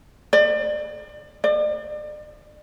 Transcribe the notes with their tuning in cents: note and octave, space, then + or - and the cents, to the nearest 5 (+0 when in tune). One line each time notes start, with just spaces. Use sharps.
D5 +35
D5 +40